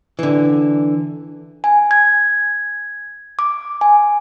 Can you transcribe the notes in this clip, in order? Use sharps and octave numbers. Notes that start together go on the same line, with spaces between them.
D3 E3
G#5
G#6
D6
G#5